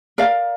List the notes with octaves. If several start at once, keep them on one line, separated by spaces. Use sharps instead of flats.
A#4 D5 F5